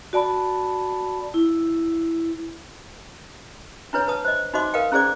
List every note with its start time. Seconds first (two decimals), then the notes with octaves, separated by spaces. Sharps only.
0.13 F#4 D5 A5 B5
1.34 E4
3.93 D4 E4 B4 C#5
4.08 B4 A5 D#6
4.25 C5 D#5
4.54 D#4 F#4 C5 D#5 C6 D6
4.74 A#4 B4 D#5 F5 G5
4.92 C#4 E4 G#4 C5 D5 D6